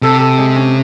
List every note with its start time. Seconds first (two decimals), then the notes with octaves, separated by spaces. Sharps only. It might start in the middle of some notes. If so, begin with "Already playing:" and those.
0.02 C3 A4
0.20 A4
0.39 G#3
0.56 C#4